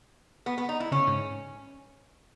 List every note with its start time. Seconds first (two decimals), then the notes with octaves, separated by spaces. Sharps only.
0.46 B3
0.58 B3
0.69 D#4
0.80 E4
0.91 C#3 C#4
1.07 G#2